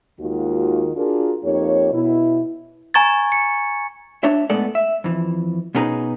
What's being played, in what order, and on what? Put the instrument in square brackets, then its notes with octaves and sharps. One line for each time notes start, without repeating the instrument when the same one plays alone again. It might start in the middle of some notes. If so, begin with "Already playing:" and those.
[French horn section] D#2 D#3 G#3 F4 F#4
D4 F4 F#4 G#4 A#4
F2 A#3 D#4 G4 C#5
B2 E4
[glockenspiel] G#5 A#5 C#6 G#6 A6
C#7
[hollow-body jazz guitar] D4 C#5 E5
A2 G#3 B3 A4 D5
E5
F2 E3
B2 C#4 D#4 G#4 B4 A#5